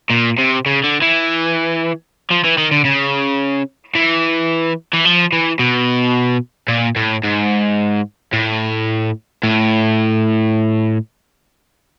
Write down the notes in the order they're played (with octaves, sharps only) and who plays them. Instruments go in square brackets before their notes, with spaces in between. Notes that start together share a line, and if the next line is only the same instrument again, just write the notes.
[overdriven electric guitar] A#2
C3
C#3
D3
E3
F3
E3
D#3
D3
C#3
E3
E3
F3
E3
B2
A#2
A2
G#2
A2
A2